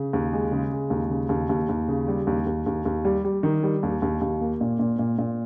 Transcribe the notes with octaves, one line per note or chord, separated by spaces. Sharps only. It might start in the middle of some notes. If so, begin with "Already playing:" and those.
Already playing: C#3
D#2
G#3
C#3
G#3
D#2
C#3
D#2
D#2
D#2
C#3
G3
D#2
D#2
D#2
D#2
G3
G3
D#3
G3
D#2
D#2
D#2
A#3
A#2
A#2
A#2
A#2